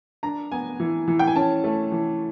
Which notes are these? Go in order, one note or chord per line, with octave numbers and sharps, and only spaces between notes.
D4 A#5
B3 G#5
E3
E3
G5
G#5
C#4 A5
A3
E3